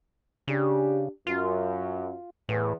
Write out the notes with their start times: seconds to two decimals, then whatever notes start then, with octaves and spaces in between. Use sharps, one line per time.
0.48 C#3 D4 G4
1.27 F#2 F4
2.49 E2 A2